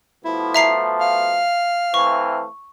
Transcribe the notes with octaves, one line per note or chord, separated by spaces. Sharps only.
B2 F3 A3 E4
E5 A#5 C7
F5
E3 A3 C4 C#6